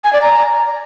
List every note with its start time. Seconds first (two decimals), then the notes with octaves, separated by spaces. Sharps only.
0.04 G#5
0.13 D5
0.22 A#5